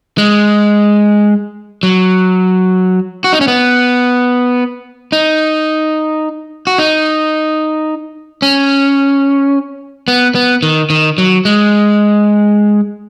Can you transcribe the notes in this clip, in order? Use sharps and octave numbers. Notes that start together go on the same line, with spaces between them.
G#3
F#3
F#4
D#4
C#4
B3
D#4
F#4
D#4
C#4
B3
B3
D#3
D#3
F#3
G#3